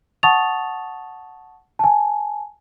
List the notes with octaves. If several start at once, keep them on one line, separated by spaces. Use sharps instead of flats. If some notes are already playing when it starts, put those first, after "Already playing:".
F#5 A5 C#6 D#6 A6 F7
G#5 A5